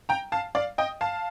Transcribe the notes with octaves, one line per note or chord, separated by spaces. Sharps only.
G5 A#5
F5 A5
D5 F5
D#5 G5
F5 A5